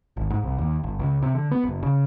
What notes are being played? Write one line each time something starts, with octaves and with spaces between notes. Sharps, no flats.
G#1
G#2
C2
D#2
G1
C#2
C3
D3
B3
F#1
C#3